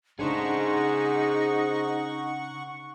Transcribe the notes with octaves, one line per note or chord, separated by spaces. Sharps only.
C#3 A3 D4 D#4 G#4 C5 F#5 C#6